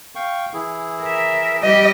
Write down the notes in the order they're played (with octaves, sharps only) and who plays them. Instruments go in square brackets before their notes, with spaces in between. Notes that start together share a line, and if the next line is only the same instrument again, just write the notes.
[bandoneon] F5 G5 C#6
E3 E4 G#4
[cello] A#4 E5
[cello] G3 G4 [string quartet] D#5